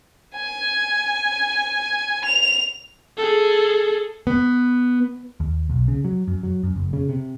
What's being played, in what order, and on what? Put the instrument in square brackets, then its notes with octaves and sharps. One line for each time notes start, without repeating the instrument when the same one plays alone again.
[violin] G#5
F7
[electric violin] G#4 A4
[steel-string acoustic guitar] B3
[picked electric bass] D#2
B1
C#3
F#3
F#2
F#3
F#2
F#1
C#3
C3